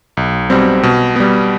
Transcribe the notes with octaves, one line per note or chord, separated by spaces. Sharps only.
B1
B2 G3 C4
B2
G3 B3